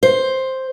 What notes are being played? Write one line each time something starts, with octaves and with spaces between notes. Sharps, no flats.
C5